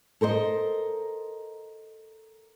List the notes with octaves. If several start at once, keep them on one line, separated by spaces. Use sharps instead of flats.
A4 A#4 C5 D#5